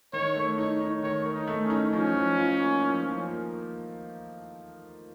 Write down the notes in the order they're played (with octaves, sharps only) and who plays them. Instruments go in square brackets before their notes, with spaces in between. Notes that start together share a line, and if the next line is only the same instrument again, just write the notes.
[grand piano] D#3 [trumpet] C#5
[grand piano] A3
[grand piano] D#4 [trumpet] C#5
[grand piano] D#4
[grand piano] D#3 [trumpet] C#5
[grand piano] A#4
[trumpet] D#4
[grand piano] A3
[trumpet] C#4
[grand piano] D#4
[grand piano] F3 [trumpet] C#4
[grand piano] F3
F4
A#3
F3
F3
A#3